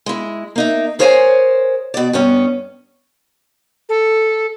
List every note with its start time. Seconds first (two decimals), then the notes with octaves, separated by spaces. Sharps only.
0.06 G#3 E4
0.56 A#3 D#4 E5
0.99 G#4 A#4 C5 C#5 E5 G#5
1.94 B2 D5
2.13 G2 B3 C#4
3.89 A4